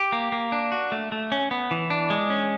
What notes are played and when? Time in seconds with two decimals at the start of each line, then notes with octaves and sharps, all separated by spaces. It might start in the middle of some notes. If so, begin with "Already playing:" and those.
Already playing: G4
0.12 A#3
0.32 A#3
0.52 D4
0.72 F#4
0.92 A3
1.12 A3
1.32 C#4
1.51 B3
1.71 E3
1.90 D4
2.10 G#3
2.30 C#4